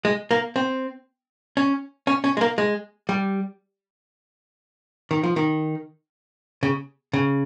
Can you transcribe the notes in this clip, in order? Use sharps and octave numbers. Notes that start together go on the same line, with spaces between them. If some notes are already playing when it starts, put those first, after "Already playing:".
G#3
A#3
C4
C#4
C#4
C#4
G#3
A#3
G#3
G3
D#3
F3
D#3
C#3
C#3